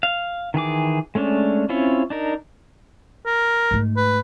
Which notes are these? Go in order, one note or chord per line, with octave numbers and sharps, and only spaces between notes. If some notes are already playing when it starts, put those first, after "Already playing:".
F5
D#3 E3 G#4 D6
G#3 A3 C#4 D4
C4 C#4 E4 F4 C#5
D4 D#4 A#4
A#4
G#2 A3
B4